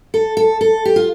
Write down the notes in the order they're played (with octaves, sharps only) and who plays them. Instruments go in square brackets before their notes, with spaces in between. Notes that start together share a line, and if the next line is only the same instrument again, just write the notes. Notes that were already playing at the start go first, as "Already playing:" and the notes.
[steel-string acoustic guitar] A4
A4
A4
G4
F4